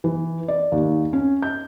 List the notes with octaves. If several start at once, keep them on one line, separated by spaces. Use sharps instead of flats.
E3
D5
D#2
C#4
G6